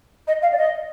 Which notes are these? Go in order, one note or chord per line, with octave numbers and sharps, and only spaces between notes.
D#5
F5
D5
D#5